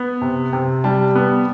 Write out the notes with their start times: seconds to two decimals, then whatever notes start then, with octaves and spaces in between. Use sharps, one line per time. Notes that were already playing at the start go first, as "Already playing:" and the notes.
Already playing: B3
0.21 C3
0.53 C3
0.84 G3 A5
1.15 B3